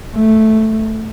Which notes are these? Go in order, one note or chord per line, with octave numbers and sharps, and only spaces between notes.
A3